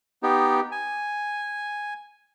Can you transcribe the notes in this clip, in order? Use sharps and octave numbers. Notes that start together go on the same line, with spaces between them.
B3 D#4 G4
G#5